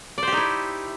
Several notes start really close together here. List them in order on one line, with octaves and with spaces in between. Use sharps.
D5 C5 G4 D#4 E4